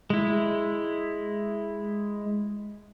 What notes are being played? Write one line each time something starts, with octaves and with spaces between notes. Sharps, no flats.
G#3 E4